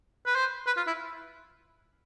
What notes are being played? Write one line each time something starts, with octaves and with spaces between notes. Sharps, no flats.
B4
C5
B4
F4
E4